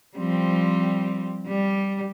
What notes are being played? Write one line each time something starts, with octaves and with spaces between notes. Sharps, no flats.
F3 G3 C4
G3